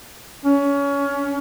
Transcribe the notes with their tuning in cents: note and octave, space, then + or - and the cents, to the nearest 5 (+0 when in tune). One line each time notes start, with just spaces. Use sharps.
C#4 +25